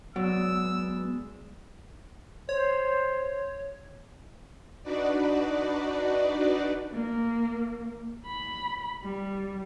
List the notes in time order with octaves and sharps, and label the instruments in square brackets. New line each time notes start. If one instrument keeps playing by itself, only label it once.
[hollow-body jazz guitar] F#3 [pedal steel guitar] G#3 D5 [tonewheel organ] B3 [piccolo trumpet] E6
[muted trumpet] C5 [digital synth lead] C#5
[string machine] D4 D#4 F#4 B4 D5
[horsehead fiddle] A#3
B5
G3